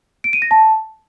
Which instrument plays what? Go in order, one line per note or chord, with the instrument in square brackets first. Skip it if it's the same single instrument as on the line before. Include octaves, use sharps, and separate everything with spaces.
[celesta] D7
D#7
A#6
A5